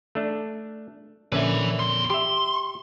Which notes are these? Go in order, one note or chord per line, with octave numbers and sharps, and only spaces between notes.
A3 D4
A#1 D3 C#4 B4 E5
E2 C6
G4 E5 C6